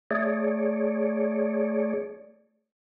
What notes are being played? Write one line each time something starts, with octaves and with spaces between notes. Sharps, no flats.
A3 G#4 C#5 D5